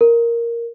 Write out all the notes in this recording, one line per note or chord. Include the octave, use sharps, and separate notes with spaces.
A#4